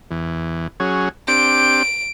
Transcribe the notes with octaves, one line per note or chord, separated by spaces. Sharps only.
E2
F#3 C#4 G#4
C4 D4 G4 D7